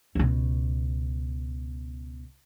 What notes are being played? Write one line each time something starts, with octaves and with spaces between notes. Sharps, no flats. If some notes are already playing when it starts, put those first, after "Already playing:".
C#2 B2